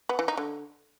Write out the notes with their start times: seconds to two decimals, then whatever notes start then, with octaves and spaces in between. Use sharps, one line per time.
0.09 B3
0.19 E3
0.28 D#4
0.37 D3